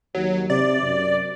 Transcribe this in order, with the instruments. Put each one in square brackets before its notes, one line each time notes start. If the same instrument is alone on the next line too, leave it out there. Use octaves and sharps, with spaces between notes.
[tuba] D#2 [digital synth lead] F#3
[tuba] C3 [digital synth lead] D5
[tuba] F#2